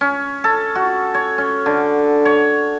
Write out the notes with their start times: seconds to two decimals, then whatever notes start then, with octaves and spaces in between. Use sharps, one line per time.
0.01 C#4
0.44 A4
0.75 F#4
1.14 C#5
1.38 C#4
1.66 D3
2.25 C#5